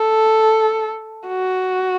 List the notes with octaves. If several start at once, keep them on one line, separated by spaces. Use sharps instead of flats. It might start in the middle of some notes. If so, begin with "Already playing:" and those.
Already playing: A4
F#4